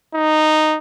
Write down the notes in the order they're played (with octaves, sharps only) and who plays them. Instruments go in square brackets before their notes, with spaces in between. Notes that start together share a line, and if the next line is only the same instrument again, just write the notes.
[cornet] D#4